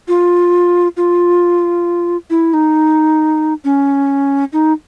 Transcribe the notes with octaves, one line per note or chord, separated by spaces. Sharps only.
F4
F4
E4
D#4
C#4
D#4